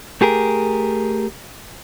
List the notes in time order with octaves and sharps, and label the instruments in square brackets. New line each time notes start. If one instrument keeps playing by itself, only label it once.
[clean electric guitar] A3 G4 G#4 A#4